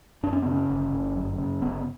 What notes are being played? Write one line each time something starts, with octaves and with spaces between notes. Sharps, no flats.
F#2 D4
C#4
B3
C#3
C#4
G1
G1
F#2
C#3
G1 B3